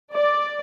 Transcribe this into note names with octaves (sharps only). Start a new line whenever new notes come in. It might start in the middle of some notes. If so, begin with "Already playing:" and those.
D5